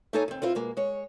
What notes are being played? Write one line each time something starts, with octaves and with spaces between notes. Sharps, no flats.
A3 A#3 D#4 A4 C#5 G#5
D#2 C4
C4 E4 F4 C5
B2 G#3 A#3
G#3 C#5